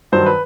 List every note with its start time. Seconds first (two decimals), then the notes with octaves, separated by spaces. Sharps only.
0.12 G2 D#3 F#3 C5
0.26 B4